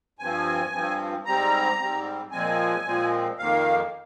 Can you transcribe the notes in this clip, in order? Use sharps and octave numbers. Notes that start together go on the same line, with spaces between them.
G2 F3 C4 G#5
G2 F3 C4
G#2 G3 C4 A#5
G#2 G3 C4
A#2 F3 G#3 C4 G#5
A#2 F3 G#3 C4
F2 D#3 A#3 F5